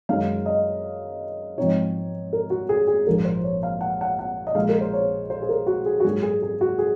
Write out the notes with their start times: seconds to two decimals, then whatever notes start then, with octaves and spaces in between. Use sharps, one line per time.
0.09 F#2 D#3 G#3 F5
0.46 D#5
1.58 G#2 F3 C4 D#4 C#5
2.33 A#4
2.50 F#4
2.69 G#4
2.87 G#4
3.07 A#1 G#2 F3 A#3 A#4
3.25 C5
3.44 C#5
3.63 F5
3.81 F#5
4.01 F#5
4.19 F#5
4.47 D#5
4.55 A#1 A#2 G#3 F5
4.69 A#4
4.81 C5
4.93 C#5
5.30 C5
5.42 G#4
5.49 A#4
5.67 F#4
5.86 G#4
6.00 F#4
6.04 G#2 F#3 A#3 G#4
6.23 G#4
6.42 G#4
6.61 F#4
6.79 G#4